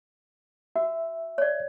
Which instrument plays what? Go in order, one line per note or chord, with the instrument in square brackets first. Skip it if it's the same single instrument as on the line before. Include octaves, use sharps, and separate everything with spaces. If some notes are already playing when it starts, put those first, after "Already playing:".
[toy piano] F#4 [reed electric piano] E5
[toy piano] C#5 D5